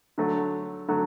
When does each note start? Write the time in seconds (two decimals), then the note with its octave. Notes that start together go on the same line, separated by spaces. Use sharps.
0.18 D3 F#3 A3
0.88 D3 F#3 A3